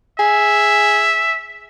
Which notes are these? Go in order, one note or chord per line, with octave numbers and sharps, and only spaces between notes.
G#4 E5